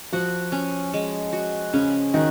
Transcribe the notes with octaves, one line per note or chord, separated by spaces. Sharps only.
F3 F#4
C#4
G#3
F#4
C#3 C#4
D#3 F#4